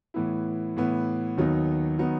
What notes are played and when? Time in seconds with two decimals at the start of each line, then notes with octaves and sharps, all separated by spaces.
0.14 A2 E3 B3 E4
0.77 A2 E3 B3 E4
1.37 D#2 D#3 F#3 B3 D#4
1.99 D#3 F#3 B3 D#4